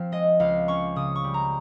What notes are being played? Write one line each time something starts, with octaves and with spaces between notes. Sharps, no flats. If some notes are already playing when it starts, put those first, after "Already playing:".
Already playing: F3 C4 F5
G#3 D#5
C#2 F5
C#4 C#6
C#3 D#6
C#6
G3
A#5